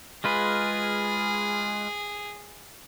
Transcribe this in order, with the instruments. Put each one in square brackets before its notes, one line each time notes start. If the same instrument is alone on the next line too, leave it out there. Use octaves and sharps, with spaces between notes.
[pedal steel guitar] G#3 F4 B4 [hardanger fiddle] G#4